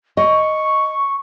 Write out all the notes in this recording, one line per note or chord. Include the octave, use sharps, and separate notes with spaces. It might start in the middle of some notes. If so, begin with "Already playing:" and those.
D#5 C#6